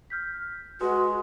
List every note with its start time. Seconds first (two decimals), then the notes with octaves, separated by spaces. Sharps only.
0.10 F6 G6 B6
0.81 G#3 F#4 B4 D#5